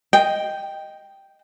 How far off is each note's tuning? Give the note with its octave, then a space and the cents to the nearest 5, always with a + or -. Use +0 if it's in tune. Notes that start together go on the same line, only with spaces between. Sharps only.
D#5 +0 G5 +0